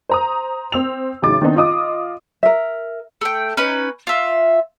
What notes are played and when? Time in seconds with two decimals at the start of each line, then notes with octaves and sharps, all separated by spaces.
0.09 C5 A#5 D#6
0.72 C4 E6 F7
1.22 A1 C#3 F#3 D#4 D6 A6
1.41 D#3 B3 C4 D4 D#4
1.56 F4 D#5 D6 D#6
2.43 A#4 E5
3.21 A3 G5
3.57 C#4 D#4 B4
4.07 F4 E5